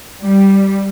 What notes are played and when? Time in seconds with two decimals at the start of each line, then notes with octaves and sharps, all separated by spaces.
0.21 G3